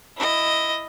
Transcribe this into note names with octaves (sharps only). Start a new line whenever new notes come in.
E4 D#5